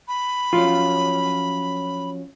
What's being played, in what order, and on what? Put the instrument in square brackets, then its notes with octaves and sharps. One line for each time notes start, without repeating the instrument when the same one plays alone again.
[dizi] B5
[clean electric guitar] F3 F#3 C#4 [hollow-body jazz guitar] F4